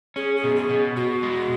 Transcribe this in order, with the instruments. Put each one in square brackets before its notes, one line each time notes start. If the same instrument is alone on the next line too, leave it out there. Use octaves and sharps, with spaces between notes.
[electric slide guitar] C#4 [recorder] G#4
[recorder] G#4
[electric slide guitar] B2
[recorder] G#4
[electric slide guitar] B2
[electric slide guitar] B2 [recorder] F#4
[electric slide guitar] G#3